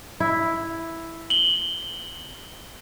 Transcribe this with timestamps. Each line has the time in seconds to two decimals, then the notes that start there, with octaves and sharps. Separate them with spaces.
0.20 E4
1.30 F#7 G7